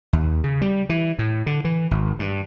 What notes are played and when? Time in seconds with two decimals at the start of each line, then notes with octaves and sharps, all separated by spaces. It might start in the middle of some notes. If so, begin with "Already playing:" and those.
0.13 D#2
0.44 C#3
0.61 G3
0.89 E3
1.19 A2
1.46 D3
1.65 E3
1.91 G#1
2.19 G2